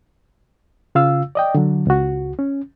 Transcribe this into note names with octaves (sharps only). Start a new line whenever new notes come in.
C#3 F4 F5 E6
D5 D#5 G5
D3 F#3
C#2 F#4
C#4